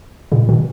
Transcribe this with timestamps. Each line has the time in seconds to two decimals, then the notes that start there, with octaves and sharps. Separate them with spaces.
0.32 A#2 C#3
0.49 B2 D#3